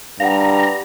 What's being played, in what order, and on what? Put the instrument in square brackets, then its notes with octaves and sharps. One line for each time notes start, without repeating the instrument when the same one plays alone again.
[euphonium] G2 [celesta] F5 F#5 [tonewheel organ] A#5